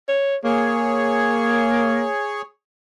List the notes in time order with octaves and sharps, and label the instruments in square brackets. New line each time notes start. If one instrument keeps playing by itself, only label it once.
[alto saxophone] C#5
[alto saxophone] A#3 [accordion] G#4 C#5